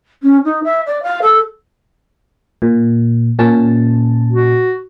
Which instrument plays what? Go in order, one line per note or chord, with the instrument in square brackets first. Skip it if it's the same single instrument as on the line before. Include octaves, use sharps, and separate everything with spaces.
[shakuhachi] C#4
D#4
E5
D5
F5
A4
[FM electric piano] A#2
A#2 C#4 A5
[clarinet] F#4